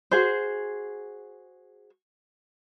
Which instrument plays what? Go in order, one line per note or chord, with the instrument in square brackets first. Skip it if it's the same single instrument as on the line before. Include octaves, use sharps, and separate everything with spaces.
[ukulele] F#4 G#4 C5